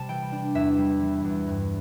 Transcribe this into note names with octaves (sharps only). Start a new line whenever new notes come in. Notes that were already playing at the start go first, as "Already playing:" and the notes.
Already playing: C3 G3 A5
E3 G5
D4
E2 E5
G3
E3
E2
G2